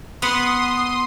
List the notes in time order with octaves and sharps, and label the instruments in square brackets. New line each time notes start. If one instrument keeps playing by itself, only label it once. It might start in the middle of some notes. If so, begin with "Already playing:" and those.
[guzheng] B3 F#5 [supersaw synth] C6 D#6